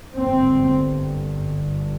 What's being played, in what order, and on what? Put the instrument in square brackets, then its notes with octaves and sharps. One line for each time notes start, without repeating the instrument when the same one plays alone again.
[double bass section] G1 G2 C4